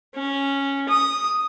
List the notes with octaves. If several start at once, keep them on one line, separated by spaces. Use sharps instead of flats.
C#4
D#6